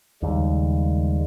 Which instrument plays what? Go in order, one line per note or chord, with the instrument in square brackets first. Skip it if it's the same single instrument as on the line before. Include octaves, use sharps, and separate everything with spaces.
[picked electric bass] D#2 [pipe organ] C#3 G3 G#3